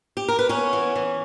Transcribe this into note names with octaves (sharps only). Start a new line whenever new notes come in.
G4
A#4
B4
B3 C#4 C#5
E3
E3